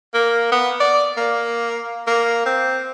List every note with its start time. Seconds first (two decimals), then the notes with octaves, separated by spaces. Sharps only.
0.14 A#3
0.52 B3
0.80 D5
1.17 A#3
2.07 A#3
2.46 C4